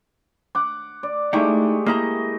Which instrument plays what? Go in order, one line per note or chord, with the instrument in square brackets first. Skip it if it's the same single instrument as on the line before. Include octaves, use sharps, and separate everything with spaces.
[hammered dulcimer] F#5 D6
D5
[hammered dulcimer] G#3 A3 G4 [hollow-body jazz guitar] D#4 E4
[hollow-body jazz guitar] A#3 E4 A#5 [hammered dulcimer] D#5